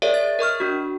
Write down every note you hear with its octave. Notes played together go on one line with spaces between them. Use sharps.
G#4 A#4 C#5 D5 E5
A6
A#4 D#5 C#6 F6
D4 F#4